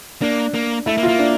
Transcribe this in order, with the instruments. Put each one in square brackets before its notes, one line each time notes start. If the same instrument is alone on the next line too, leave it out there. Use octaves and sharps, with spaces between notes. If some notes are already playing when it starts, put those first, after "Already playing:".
[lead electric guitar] A#3 [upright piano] D4
[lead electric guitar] A#3
[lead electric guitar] A3 [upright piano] E4
[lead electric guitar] A#3
[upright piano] F4
[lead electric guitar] A#3
[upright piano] D4